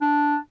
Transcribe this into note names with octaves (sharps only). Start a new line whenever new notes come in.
D4